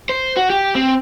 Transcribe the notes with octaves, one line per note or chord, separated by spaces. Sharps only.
C5
F#4
G4
C4